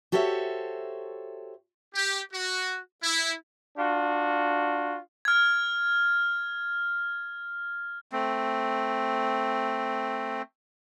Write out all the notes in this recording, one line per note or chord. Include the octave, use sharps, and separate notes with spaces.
F#4 G4 A4 C5 C#5 E5
G4
F#4
E4
D4 F4 F#4
F6 G#6
A3 C4